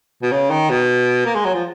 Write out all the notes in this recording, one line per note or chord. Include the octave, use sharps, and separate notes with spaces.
B2
C#3
D#3
B2
A#3
G#3
F#3
F3